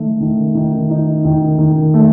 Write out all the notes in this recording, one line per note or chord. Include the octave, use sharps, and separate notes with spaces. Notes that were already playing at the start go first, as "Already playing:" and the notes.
Already playing: D#3 A3
D#3
D#3
D#4
D#3
D#3
A3